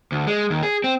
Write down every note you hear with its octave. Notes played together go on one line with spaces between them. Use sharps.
D2
G#3
D#2
G#4
C4